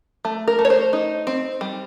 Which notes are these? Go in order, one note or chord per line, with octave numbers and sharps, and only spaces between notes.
A3
A#4
A3
C#5
C5
D#4
C4
G3